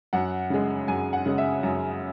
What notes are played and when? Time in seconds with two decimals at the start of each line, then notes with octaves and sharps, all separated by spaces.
0.13 F#2 F#5
0.50 C#3 G#3
0.88 F#2 G#5
1.13 F#5
1.26 C#3 G#3
1.38 E5
1.63 F#2